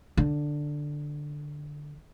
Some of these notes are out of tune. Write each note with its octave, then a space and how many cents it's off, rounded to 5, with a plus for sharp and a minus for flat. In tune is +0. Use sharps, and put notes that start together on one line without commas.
D3 +5